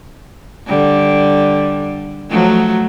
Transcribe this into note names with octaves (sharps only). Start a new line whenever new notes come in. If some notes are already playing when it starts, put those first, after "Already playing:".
D3 G3
F3 F#3 A3